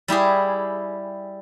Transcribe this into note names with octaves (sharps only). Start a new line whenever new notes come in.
G3 E4 G4 G#4